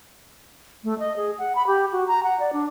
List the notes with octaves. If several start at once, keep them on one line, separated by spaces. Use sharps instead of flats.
A3
D#5
G#4
F#5
B5
G4
F#4
A#5
F#5
D5
D4